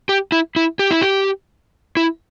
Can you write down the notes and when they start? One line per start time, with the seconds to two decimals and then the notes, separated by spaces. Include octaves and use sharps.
0.09 G4
0.32 E4
0.56 E4
0.79 G4
0.91 E4
1.01 G4
1.97 E4